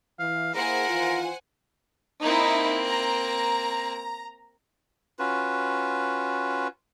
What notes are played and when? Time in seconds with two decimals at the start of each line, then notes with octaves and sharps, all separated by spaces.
0.19 E3 F5
0.55 A#3 E4 G#4 A#4 C5 F#5 G#5
0.89 D#3 E3 F4
2.22 A#3 C4 D#4 E4
2.88 A#5
5.19 C#4 F4 F#4 B4